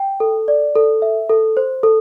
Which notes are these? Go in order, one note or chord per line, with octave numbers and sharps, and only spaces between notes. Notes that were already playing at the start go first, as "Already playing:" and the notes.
Already playing: G5
A4
D5
A4
E5
A4
C5
A4